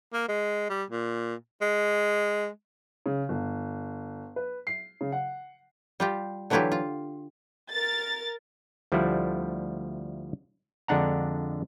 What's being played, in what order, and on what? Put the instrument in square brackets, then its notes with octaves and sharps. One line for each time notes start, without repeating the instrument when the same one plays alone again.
[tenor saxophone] A#3
G#3
G3
A#2
G#3
[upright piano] C#3
G1
B4
C7
C#3
F#5
[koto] G3 F4 G4
D3 E3 F#3 E4 F4 G4
F4
[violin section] A#4 A6
[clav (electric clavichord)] D2 F3 G3 A3 E4 F#5
F2 D3 G#3 D4 F#5 A#5